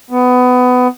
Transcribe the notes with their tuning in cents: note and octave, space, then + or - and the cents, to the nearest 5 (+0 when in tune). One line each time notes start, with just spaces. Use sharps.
B3 +20